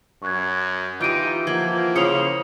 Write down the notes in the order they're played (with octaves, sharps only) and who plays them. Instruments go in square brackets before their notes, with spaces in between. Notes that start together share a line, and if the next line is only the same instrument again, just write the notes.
[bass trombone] F#2 [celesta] C#6 F#6 G#6
[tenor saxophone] E3 [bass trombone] D#4 [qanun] F4 G4 [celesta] G6 D7 D#7
[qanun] F3 [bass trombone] A#3 [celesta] F#5 G#6
[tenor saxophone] C#3 [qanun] E4 C5 [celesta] C#7 F7